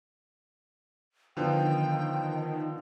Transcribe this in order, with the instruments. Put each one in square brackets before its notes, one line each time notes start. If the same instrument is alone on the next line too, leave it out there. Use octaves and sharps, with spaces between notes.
[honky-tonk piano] D3 F3 B3 [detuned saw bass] D#3 [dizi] G5